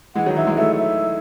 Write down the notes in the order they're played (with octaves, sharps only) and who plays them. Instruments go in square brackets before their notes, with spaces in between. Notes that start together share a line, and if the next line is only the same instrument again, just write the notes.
[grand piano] E3 G#3 [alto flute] F#5
[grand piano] D#3 F#3
[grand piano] E3 [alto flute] E5
[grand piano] E3 G#3
[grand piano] F#3 A3 [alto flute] E5
[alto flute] E5